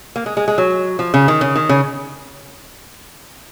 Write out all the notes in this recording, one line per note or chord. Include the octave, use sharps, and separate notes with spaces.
A#3
G#3
G#3
G#3
F#3
F3
C#3
D#3
C#3
D#3
C#3